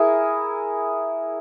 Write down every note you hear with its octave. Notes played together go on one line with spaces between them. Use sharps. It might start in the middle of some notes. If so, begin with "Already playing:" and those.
Already playing: E4 G#4 A#4